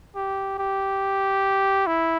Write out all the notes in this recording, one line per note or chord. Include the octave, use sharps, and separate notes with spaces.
G4
G4
E4